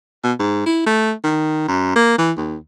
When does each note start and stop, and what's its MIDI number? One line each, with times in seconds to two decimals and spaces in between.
0.24 0.33 47
0.39 0.65 44
0.66 0.86 64
0.87 1.13 57
1.24 1.66 51
1.68 1.91 42
1.96 2.17 58
2.18 2.32 52
2.37 2.56 39